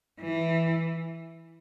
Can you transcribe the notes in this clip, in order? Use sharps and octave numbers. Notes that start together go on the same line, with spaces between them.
E3